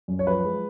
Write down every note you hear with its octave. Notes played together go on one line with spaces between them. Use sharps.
F#2
C#5
F3 B4
G#3